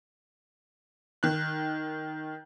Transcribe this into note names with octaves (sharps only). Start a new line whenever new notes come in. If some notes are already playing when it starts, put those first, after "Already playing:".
D#3 F#6